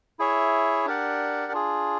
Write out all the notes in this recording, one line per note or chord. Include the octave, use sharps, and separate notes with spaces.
E4 G#4 C#5 E5
D4 G4 A#4 D5 F#5
D4 F4 G#4